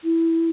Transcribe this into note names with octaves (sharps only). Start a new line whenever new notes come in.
E4